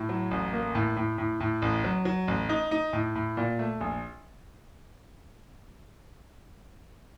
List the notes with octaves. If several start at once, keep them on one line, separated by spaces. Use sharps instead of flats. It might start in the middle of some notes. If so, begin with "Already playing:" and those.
Already playing: A2
F#3
A1
A#3
A2
A2
A2
A2
A1
F#3
F#3
A1
D#4
D#4
A2
A2
A#2
A3
A#1